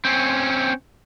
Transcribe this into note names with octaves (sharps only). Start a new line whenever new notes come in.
C4 C#4